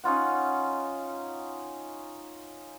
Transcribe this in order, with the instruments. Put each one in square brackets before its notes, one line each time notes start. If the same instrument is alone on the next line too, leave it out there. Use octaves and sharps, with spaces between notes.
[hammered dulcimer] C#4 D#4 F4 F#5